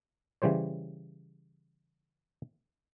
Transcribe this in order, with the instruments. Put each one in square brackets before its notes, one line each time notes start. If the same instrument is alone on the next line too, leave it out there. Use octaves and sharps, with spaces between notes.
[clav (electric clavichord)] C#3 E3 G3 C5 C#5